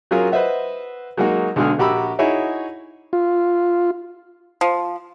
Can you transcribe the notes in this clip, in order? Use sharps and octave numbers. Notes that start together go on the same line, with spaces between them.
F#3 C#4 F4 G#4 A#4
B4 C5 D#5 E5 F#5
F#3 G#3 A#3 D#4 F#4
B1 D3 G#3 F#4 G#4 F6
A#1 F#4 G4 A#5 B5 E6
D#4 E4 F#4 G#4 C#5 E5
F4
F3